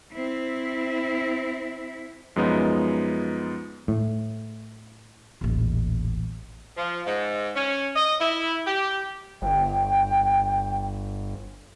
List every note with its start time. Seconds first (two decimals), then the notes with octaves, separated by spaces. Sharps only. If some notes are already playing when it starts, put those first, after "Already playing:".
0.13 C4 E4
2.36 F#2 F3 G#3 B3 D#4
3.88 A2
5.41 D#1 A1
6.77 F3
7.07 G#2
7.56 C#4
7.96 D#5
8.20 E4
8.67 G4
9.42 G1 G5